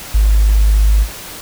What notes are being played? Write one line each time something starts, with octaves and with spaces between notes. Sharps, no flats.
G#1